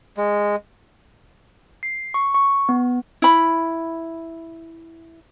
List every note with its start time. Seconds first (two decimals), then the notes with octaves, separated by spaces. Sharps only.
0.17 G#3
1.83 C7
2.14 C#6
2.34 C#6
2.69 B3
3.22 E4 B5